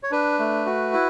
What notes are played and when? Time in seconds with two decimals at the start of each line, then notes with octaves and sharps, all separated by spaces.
0.03 C#5
0.12 D4 B4
0.39 A3
0.66 F#4
0.93 E4